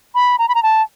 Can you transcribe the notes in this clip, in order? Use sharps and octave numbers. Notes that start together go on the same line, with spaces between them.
B5
A#5
B5
A#5
A5